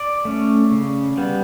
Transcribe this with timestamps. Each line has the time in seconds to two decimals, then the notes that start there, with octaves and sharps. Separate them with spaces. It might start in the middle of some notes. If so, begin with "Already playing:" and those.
Already playing: D5
0.25 A3 C#4
0.71 C#3
1.17 G3 B3